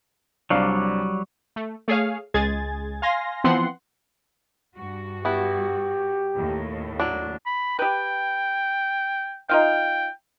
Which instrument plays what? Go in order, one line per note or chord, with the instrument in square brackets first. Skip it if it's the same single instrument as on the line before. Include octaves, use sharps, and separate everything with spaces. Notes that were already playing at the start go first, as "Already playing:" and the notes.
[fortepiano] C2 D4 F5 [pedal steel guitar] F#3 G3
[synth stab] A3
A3 G#4 C#5 F5
C#2 G#3 G#4 G#6 A6
F5 G#5 C6 A#6
E3 F3 B3 C4 F#5 C6
[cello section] G2 F#4
[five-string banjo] B3 E4 [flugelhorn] G4
[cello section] D#2 A2
[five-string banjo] F#3 D4
[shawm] B5
[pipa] G4 B4 [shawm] G5
[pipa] D#4 F4 F5 [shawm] G5